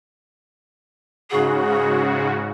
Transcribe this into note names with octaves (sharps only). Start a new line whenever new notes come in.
G#2 C#3 F#4 G#4